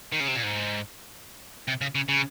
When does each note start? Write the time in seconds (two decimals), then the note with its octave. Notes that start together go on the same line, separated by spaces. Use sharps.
0.12 D#3
0.20 C#3
0.28 C3
0.35 A#2
0.43 G#2
1.68 C3
1.81 C#3
1.95 C#3
2.09 C#3